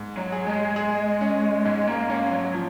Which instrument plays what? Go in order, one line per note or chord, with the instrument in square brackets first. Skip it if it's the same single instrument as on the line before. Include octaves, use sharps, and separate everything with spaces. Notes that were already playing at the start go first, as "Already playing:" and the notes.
Already playing: [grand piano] G#2
[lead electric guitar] F#3
[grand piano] G#4
[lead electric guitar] G#3
[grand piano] G#4
C#4
[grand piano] G#2 [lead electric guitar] G#3
[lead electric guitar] A#3
[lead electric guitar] A#3 [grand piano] C#4
[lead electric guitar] F#3
[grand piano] F3